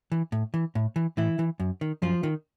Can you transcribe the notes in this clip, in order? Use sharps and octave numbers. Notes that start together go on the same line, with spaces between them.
E3
A2
E3
A2
E3
A2 E3 E4
E3
F#2
D#3
F#2 F3 F4
D#3